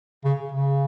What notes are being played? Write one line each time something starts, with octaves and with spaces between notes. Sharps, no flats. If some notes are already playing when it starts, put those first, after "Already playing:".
C#3
C#3